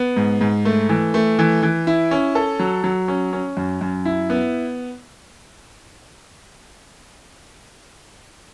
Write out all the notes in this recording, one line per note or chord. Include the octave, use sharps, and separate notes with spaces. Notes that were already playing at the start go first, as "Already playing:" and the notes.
Already playing: B3
G#2
G#2
A3
E3
A3
E3
E3
E4
C#4
A4
F#3
F#3
C#4
C#4
F#2
F#2
E4
B3